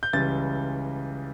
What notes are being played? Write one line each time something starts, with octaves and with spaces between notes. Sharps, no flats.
G6
C#2 C#3 E3 G3 A6